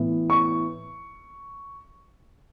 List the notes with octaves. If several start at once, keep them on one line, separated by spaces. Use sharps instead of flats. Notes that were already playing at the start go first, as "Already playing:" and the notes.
Already playing: A2 E3 B3
C#6